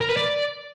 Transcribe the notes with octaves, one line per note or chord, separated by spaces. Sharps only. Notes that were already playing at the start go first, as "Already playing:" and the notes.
A#4
B4
D5